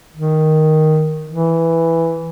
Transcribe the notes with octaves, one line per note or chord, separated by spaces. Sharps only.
D#3
E3